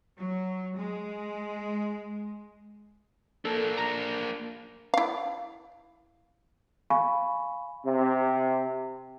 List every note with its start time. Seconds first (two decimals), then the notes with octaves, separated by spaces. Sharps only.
0.17 F#3
0.77 G#3
3.45 A#3 D4 A4
3.77 A#5
4.94 E4 F5
6.90 F5 G#5 B5 C#6
7.86 C3